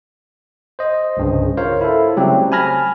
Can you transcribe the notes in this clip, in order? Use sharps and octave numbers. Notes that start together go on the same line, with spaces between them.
C5 D#5
C2 G2 C#3
F4 A#4 C5 C#5 F5
E4 A4
C#3 F#3 G3 A3 C4 G4
G#5 A5 B5 F6 G#6 A#6